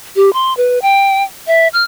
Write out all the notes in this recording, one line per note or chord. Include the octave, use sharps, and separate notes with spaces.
G4
C6
B4
G5
E5
F6